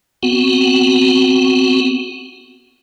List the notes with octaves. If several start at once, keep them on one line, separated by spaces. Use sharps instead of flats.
B3 C4 F#4